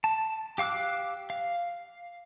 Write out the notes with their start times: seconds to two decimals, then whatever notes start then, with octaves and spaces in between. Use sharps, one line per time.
0.04 A5
0.58 G4 F5 D6 E6 F#6
1.30 F5